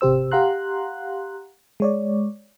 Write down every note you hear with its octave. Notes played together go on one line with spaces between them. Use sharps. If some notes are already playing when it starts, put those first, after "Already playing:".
G#1 C3 G4 C5 E6
G4 F5 F#5 A#5 C6 F#6
G#3 C#5 D5